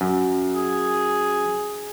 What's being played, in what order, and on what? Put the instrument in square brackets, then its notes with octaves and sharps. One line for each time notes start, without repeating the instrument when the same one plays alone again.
[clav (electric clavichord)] F#2
[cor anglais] G#4